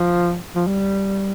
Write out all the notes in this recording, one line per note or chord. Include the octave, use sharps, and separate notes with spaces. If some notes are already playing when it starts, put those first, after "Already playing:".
Already playing: F3
F3
G3